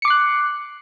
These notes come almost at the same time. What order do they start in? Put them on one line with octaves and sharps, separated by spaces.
C#7 D6 C7 F#6